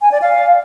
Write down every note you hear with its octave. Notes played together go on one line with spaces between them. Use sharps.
G#5
D5
F5